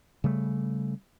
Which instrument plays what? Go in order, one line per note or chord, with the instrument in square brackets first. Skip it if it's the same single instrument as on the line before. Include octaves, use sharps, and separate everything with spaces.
[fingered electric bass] C#3 G3 A3